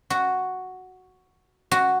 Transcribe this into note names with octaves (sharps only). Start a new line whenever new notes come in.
F#4
F#4